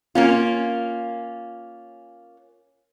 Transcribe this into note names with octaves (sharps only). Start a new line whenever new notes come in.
A#3 C#4 F4